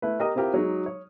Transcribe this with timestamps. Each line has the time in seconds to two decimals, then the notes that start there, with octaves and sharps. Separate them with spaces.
0.02 A3 E4 B4
0.20 G4 A#4 D#5 A#5 D#6
0.35 C4 E4 F4 G4 A#4
0.54 F#3 G#3 D#4
0.86 C#5